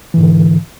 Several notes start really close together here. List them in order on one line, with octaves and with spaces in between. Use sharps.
E3 G#2 D3